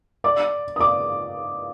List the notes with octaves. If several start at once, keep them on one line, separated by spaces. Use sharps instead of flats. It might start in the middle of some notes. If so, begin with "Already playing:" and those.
D5 D6
D#6
D5 D6